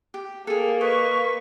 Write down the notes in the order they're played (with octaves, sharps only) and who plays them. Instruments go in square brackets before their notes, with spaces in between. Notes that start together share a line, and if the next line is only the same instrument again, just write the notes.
[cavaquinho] G4
[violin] A#3 [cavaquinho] G#4 A4
[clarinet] B4 [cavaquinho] D#5 [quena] C#6